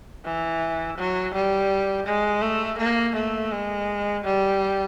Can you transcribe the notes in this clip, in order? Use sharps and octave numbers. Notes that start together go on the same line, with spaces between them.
E3
F#3
G3
G#3
A3
A#3
A3
G#3
G3